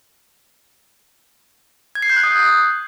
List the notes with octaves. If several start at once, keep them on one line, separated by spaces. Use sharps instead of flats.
G#6
C7
G6
F#6
D#6